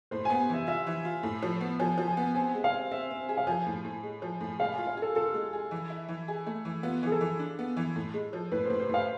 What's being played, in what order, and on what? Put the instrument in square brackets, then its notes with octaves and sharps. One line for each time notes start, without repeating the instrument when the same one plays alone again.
[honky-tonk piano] A2 [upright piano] C5
[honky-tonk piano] B3 [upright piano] G#5
[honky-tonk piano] E3 [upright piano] E5
[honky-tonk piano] F4 [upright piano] E5
[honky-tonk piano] E3
F4
A2
F3
B3
[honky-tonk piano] F3 [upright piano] G#5
[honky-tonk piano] F3
[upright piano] G#5
[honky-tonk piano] B3
[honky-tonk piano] C4 [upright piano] G#5
[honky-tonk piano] G#3
[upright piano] F5
[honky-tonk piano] C4
[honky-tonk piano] C4 [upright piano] E5
[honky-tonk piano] C4
G#4
[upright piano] F5
[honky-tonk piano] F3 [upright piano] G#5
[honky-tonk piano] A2
A2
G#3
F3
A2
[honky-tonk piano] G#3 [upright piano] F5
[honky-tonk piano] F4 [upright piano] G#5
[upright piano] F5
[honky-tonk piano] G#4
[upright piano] A4
[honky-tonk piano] F4 [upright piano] A4
[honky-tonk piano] G#3
G#4
E3
E4
E3
G#4
A3
E3
[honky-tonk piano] B3 [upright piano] F4
[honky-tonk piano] E3 [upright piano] G#4
[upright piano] A4
[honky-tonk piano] E3
D4
B3
E3
A2
G#3
F3
[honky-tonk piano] A2 [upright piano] B4
[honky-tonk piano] A2 [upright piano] C5
[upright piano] C5
[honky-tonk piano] A2 [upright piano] F5